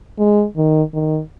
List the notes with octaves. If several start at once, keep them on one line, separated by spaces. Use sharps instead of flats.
G#3
D#3
D#3